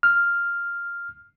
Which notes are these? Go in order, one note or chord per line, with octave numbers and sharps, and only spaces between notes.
F6